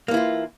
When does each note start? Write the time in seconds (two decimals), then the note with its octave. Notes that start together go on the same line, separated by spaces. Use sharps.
0.08 A#3
0.11 E3
0.14 E4
0.17 F4